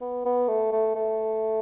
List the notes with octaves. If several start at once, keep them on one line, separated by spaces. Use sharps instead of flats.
B3
B3
A3
A3
A3